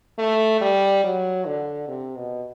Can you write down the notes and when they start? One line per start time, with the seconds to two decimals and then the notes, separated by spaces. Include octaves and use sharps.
0.18 A3
0.61 G3
1.04 F#3
1.45 D3
1.88 C3
2.16 B2